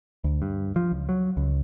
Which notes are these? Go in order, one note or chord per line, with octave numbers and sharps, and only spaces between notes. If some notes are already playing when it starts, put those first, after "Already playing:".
D2
G2
F3
C#2
F#3
C#2